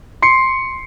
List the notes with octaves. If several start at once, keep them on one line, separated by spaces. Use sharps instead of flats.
C6 C7 C#7